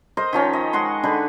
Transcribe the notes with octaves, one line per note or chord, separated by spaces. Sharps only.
A#4 C5 D#5
D#3 F3 C#4
D#5
G#3 F#5 C6 C#6
D3 D#4 G#4 B4